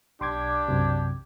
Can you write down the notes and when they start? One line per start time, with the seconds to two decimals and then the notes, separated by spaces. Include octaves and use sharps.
0.21 B1 D4 G4 C6 D6 G#6
0.68 F#2 C3